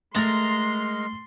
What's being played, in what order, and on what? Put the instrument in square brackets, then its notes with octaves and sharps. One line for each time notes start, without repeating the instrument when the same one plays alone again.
[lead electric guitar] G#3 A#4 [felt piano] A3 A6 [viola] C6